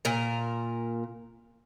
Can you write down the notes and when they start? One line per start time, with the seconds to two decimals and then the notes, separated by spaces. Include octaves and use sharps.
0.05 A#2 A#4